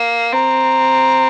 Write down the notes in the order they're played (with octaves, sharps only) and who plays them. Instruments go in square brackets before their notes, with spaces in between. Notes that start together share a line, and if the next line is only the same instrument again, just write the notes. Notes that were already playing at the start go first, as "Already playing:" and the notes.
Already playing: [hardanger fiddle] A#3
[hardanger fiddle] C4 [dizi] A#5